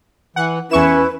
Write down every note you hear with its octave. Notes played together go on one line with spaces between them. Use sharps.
E3 F#5
E2 C#4 E4 B4 C#6 E7